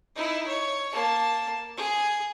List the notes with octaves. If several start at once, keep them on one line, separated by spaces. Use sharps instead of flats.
D#4 E4
C#5
A#3 A5
G#4